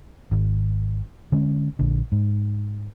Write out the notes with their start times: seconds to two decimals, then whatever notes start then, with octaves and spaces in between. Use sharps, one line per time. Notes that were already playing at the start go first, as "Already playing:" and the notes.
0.31 G#1
1.32 D3 G#3 C#4
1.79 A#1 D3
2.12 G#2